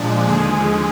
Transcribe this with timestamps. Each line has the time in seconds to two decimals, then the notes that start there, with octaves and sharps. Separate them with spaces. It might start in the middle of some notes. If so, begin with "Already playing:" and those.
Already playing: A#2 F3 G#3 D4
0.28 D#2 D3 F3 G#3 G#4